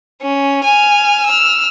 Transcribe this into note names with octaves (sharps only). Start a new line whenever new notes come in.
C#4
G#5 F6
E6 F6